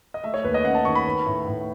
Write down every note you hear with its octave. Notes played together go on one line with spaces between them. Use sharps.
D#5
A3 E5
C#5
D#2 B4
D#5
C#4 F#5
A5
D#3 C#6
B5
B3
A2
A2